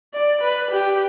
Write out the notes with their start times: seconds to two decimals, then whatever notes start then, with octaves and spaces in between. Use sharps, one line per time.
0.14 D5
0.42 B4
0.71 G4